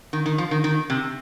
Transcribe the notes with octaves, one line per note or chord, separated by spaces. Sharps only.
D#3
D#3
F3
D#3
D#3
C3